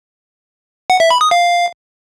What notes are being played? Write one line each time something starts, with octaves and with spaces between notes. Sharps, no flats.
F#5
E5
B5
D#6
F5